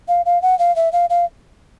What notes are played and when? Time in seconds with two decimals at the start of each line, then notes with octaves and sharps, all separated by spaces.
0.08 F5
0.26 F5
0.42 F#5
0.59 F5
0.76 E5
0.93 F5
1.10 F5